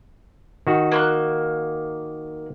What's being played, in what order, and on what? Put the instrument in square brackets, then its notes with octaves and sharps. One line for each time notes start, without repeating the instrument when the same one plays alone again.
[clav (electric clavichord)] D#3 F#4
[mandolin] A#3 B5 F#6